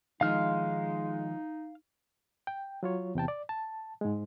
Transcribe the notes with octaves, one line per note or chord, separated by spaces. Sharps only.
D#3 F3 G#3 D#4 F5 F6
G5
F#3 F4 C#5
E2 C3 G5 A5
D5
A5
G#2 G#3